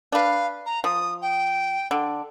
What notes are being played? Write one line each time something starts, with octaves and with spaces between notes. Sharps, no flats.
D4 B4 F5
A#5
F3 D#6
G5
D3